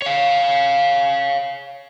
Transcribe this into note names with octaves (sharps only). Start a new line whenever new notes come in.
C#5 F5